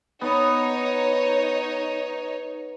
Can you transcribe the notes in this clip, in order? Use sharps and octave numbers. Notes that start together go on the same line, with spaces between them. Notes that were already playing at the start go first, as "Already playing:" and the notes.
B3 D#4 C#5